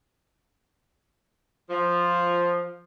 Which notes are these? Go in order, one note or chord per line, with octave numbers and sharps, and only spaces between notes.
F3